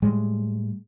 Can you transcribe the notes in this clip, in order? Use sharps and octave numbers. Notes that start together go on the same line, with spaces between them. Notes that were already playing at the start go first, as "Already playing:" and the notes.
A2 G3 G#3